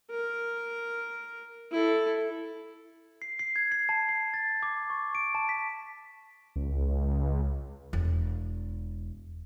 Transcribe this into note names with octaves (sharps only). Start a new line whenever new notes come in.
A#4
E4 A4
C7
C7
G#6
C7
A5
C7
A6
D6
C#6
D7
A5
B6
C#2
E1